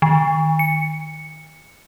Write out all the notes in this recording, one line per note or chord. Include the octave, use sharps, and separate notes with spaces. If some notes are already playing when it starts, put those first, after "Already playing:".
D#3
C#7